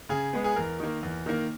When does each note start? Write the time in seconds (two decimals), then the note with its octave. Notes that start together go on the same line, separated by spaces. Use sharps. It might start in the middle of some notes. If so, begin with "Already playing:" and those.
0.09 C#3 G#4
0.33 G#3 B3
0.44 G#4
0.56 E2 A#4
0.80 D#3 A#3
1.03 E2
1.26 D#3 A#3